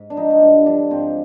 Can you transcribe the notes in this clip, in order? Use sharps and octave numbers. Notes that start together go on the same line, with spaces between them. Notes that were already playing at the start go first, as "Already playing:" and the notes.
Already playing: G#2
D4
F3 D#4
D#4
G2 D4
D3 F3 D4
G#2 C4